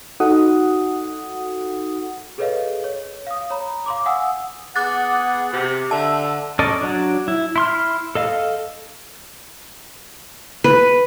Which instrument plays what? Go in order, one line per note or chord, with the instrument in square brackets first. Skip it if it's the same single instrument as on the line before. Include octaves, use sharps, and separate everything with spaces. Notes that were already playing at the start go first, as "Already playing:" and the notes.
[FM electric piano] D#4 F#4 A4 F#5 D#6
[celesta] G#4 A4 B4 C#5 D#5 F5
C#5
F5 D#6
C#5 A#5 B5
F5 C6 D6
F5 F#5 G#5 D#6 E6
[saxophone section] B3 G#4 [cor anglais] F#5 [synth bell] D6 F#6 A6
[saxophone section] C3
[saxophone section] D3 [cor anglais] E5 [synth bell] A5
[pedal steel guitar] C#4 A4 D5 D#5
F#3 D4
E4
E4 C6 F6
A4 D#5 F5
[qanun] B4